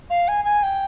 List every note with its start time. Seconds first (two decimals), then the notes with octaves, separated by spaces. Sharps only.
0.10 F5
0.28 G#5
0.44 G#5
0.63 G5